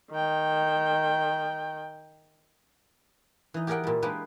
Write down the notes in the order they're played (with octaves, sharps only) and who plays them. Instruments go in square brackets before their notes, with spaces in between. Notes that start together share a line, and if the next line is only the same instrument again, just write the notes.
[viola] D#3 G5
[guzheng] E3 D#4
G4 G#4 A#4 D5 F#5 G5
A#2 G3
G#3 A#3 D4 D#4 G4 B4